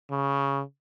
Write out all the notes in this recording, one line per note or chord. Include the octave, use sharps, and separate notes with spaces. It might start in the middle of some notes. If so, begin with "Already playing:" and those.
C#3